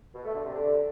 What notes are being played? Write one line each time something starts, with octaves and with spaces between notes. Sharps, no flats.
B2
A3
D3
C3
D3